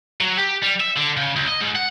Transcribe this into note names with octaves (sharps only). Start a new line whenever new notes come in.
F#3
G4
G3
E5
D3
C#3
C#2
D#5
G#2
F#5